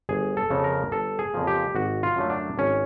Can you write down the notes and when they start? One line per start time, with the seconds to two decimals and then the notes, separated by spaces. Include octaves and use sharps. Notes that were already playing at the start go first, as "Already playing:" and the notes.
0.09 G1 G#4
0.37 A4
0.50 F2 C#3 F3 A#3
0.64 A#4
0.92 G1 A4
1.19 G#4
1.34 F2 C#3 F3 A#3
1.47 G4
1.75 G#1 F#4
2.03 F4
2.16 F#2 D3 F#3 A3
2.30 D4
2.58 G#1 C#4